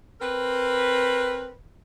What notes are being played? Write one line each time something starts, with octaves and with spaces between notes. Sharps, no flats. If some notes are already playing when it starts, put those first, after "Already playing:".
C4 A#4 B4